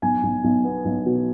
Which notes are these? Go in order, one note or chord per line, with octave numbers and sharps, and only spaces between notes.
B1 G#5
B1
B1
B3
B1
B2